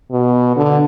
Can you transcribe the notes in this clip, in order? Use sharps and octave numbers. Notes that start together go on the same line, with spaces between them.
B2
D3